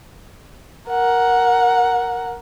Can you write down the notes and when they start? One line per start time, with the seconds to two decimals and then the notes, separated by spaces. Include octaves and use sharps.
0.89 A#4 F#5